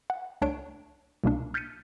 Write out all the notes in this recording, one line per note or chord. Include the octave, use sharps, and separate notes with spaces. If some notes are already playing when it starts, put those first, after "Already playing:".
F#5
C#2 A3 D4 C#5 D7
C2 B2 A#3 D4
F6 G6 A6 B6 C#7 D#7